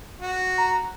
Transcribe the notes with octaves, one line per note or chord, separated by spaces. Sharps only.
F#4
A#5